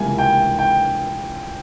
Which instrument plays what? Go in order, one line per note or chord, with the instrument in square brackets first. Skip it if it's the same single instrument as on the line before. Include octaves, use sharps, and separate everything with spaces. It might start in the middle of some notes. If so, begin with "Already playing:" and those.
Already playing: [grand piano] C#2 C3 E3 G3 A#3 G#5
G5
G5